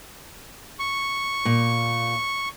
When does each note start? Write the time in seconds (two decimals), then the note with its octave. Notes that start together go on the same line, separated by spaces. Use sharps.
0.79 C#6
1.45 A#2